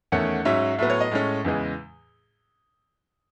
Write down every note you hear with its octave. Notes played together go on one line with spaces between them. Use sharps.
E2 D#3 A3 C#4 F#5
G#2 F#3 C#4 E5
A2 F#3 B3 E5
C#5
D#5
A2 G#3 C#4
E2 C#3 E3 G#3